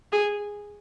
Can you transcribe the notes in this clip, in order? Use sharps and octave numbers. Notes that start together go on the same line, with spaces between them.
G#4